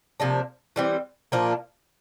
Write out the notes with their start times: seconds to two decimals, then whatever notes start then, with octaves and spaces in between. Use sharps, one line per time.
0.20 C3 F3 A#3 D4
0.76 E3 G3 C4
1.32 A#2 F3 A#3 D4